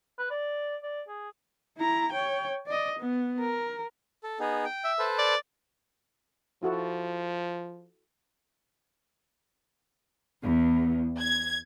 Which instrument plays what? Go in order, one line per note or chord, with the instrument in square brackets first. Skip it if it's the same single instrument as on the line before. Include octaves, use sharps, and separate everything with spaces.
[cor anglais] B4
D5
D5
G#4
[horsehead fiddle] E4 A#5
C#5 G5
D5 D#5
B3
A#4
[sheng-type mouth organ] A4
B3 D#4 G#4
G5
[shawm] E5
[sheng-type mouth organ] A4 B4 C5
[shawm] D5
[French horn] F3 [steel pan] E4 F#4 A4
[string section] E2
G#6